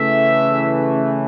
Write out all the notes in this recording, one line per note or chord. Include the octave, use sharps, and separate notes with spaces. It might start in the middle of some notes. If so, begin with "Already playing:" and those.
Already playing: C#3 E3 A3 E5